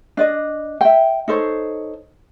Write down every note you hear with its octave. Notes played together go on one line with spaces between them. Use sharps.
D4 D5 D#5
E5 G5
D#4 A4 C5 C#5